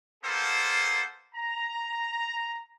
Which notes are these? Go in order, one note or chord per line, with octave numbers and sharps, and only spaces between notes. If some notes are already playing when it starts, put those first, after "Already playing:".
A#3 B3 F4 G#4 A4 C5
A#5